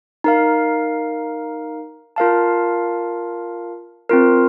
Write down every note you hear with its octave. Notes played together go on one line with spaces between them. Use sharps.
D#4 A#4 F5
F4 A#4 F5 A5
C4 F4 A#4